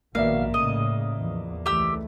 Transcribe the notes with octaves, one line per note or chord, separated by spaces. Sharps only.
A#1 B2 D#3 A#3 D5 E5 F5
A2 C#3 D#5
E2 F3
C#2 E3 A3 G4 E6